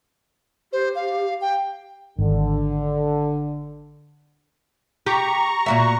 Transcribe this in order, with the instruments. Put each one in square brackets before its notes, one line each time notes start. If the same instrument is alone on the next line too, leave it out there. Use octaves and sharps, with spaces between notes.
[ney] G4 [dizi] C5
[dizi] F5
G5
[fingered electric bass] G#1 [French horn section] D3
[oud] G4 [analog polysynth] A#5 C#6
[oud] A#2 F#4 E5